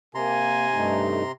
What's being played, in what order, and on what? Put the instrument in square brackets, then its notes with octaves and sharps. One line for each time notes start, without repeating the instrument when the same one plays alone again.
[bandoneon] C3 A#5 C6 [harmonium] A#3 [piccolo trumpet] G#5
[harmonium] G2 A3 D#4